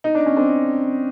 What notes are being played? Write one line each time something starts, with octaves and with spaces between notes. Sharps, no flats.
D#4
D4
C#4
C4 D4